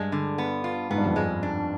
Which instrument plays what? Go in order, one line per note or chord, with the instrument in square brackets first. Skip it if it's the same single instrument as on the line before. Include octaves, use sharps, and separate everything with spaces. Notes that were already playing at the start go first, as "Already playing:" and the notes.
Already playing: [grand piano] G2 [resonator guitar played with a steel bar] G#3
[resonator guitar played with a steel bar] D3
B3
F4
[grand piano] G#2 [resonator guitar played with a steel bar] B3
[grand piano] G2
F2
[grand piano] G2 [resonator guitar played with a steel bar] G#3
[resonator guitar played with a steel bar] D4